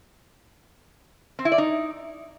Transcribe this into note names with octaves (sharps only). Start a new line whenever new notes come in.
C4
E4
D5
D#4